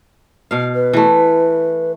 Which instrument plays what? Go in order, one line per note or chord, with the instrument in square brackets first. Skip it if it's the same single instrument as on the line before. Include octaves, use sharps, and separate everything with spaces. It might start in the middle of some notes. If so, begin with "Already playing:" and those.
[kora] B2 F5
[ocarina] B4
[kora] E3 A3